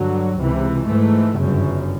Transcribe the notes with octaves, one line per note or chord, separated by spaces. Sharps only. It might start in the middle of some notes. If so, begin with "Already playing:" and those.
Already playing: G2 D3 F#3
C#2 C3 E3
G#2 E3 A3
G1 F#2 C#3